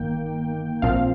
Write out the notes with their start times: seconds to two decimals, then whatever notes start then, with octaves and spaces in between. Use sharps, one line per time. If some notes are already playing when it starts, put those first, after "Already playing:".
Already playing: G1 D#3 A#3 G5
0.82 A#1 A#2 F3 C4 F5